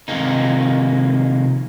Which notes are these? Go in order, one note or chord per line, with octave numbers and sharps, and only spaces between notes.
C3 D#3 F3 G#3 A#3 D#4